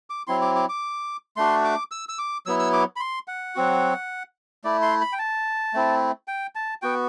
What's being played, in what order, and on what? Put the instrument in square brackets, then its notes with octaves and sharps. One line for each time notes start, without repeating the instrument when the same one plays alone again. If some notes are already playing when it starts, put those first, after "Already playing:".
[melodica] D6
F#3 C4 E4 C6
D6
D6
D6
A3 D4 F#4 C6
D6
E6
E6
D6
F#3 B3 E4 E6
E6
D6
B5
C6
F#5
F#3 C4 F#4
A3 E4 D5
C6
B5
G5
A5
A3 C4 E4
G5
A5
B3 F#4 G5